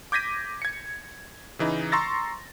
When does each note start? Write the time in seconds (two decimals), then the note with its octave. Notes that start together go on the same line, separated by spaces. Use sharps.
0.12 D6 G6 G#6 A#6 B6 D#7
0.62 G#6 C#7
1.59 C#3 E3 D#4
1.92 A#5 C6 C#6 E6 A6 A#6